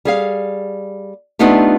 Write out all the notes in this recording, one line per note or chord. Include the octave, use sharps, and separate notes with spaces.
G3 G#4 F5
A3 B3 D4 D#4 F4 G4